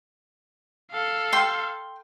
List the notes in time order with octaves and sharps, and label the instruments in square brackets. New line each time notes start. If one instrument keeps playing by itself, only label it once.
[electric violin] A4 F5
[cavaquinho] G5 C6